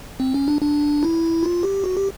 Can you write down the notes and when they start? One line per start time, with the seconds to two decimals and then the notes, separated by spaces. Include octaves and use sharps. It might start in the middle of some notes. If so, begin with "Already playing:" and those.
0.20 C4
0.34 C#4
0.48 D4
0.62 D4
1.03 E4
1.43 F4
1.63 G4
1.84 F#4
1.97 G4